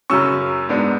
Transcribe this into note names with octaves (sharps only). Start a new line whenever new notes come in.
F#2 C#3 F#3 C#4 C#6 E6
G#2 G#3 B3 D4